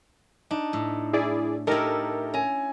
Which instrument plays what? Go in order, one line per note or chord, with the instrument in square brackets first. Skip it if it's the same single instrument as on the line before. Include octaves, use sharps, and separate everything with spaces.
[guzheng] D4 [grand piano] D#4
[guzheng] A2
[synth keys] E4 G#4 D5
[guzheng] A3 E4 [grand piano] D#4 G4 D#5 [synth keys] A4 A#4
[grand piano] C#4 G#5 [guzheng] A#5